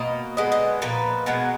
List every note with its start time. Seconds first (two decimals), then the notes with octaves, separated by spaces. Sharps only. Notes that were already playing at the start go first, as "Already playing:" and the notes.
Already playing: B2 A#3 D#5
0.37 D3 G#3 B3 D#5
0.52 D#5
0.82 A#2 F3 A#3 B4
1.26 B2 G#3 B3 A#4